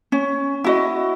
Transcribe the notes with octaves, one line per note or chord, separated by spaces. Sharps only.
C#4
E4 F#4 D#5